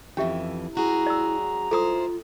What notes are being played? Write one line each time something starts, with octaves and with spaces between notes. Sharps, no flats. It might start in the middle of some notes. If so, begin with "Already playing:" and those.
F2 E3 C#4 G4 E5
F#2 E4 F#4 G#4 A#5
D5 E6
E4 F4 A4 C5 D6 D#6